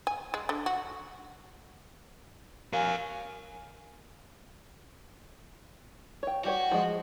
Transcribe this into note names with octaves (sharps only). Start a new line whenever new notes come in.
G#5
G#3
D3
F#4
A#4 C#5 F5 G#5
C#5 G5
G3 F#4 G4 C#5
F3 G#3